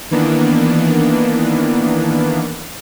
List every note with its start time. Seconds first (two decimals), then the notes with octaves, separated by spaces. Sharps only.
0.11 D#3 E3 A#3 B3 D4